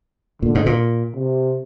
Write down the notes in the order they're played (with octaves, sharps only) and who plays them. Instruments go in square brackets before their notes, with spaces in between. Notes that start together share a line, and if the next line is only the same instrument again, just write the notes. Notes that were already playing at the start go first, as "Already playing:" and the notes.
[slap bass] A#2 [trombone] D3
[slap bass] G#2
A#2
[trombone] C3